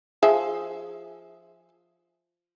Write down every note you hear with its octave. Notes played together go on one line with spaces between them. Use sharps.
F3 G#4 E5